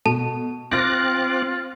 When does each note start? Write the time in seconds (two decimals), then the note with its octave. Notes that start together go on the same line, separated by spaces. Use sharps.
0.06 B2 A4 A5
0.71 C4 F4 D6 F6 F#6 A6 A#6